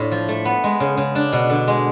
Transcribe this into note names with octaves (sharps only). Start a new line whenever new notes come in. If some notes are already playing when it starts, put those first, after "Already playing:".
Already playing: A2 D4 F4
F3
A3
B3
G#3
C#3
C#3
D4
B2
D3
G#3